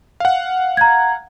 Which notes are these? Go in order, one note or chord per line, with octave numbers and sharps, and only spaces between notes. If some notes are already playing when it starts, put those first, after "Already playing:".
F5 F#5
A#5 G#6